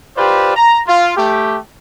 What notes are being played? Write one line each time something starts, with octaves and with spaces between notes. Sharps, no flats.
F4 G4 B4 C5 D5
A#5
F4
A3 G4